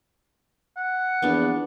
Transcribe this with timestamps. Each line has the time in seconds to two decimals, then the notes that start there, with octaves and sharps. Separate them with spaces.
0.77 F#5
1.22 A#1 E2 B3 D4